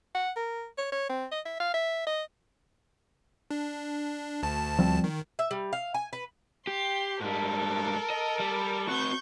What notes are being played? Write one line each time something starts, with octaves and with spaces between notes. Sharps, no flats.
F#5
A#4
C#5
C#5
C4
D#5
E5
F5
E5
D#5
D4
D2 A5
F3 G3 C4
D#3
E5
G3
F5
G#5
B4
G4 C6
G#2 G3 A4 A#4
D#5
G3
C4 F#4 C#6 G6